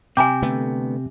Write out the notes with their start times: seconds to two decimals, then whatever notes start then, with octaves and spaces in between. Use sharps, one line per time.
0.17 C3 G5 G#5 A#5 D6
0.42 D3 A3 B3